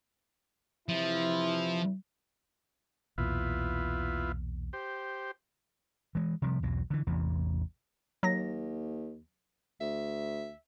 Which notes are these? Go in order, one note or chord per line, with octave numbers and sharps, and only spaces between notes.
C3 E3 F3 E4
B1 E2 A#2 B3 E4 F4
G4 C5
E3 G#3
C3 F3 G3
B1 E2 F#3
D3 E3
A1 E2 C3 E3
D#2 F#3 A#6
D2 E5